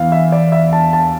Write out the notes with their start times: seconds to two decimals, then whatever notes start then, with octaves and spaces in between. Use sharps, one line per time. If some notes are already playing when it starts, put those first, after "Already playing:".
Already playing: E2 E3 F5
0.12 E5
0.32 D5
0.52 E5
0.73 A5
0.93 A5